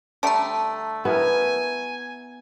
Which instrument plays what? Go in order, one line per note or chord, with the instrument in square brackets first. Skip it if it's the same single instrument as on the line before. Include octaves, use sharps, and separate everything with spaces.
[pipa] D3 G3 A3 [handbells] A5 A#5
[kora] B3 E4 A#4 [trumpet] G#5